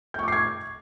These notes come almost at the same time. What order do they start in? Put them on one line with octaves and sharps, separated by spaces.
G6 C#6 D6 C7 G#6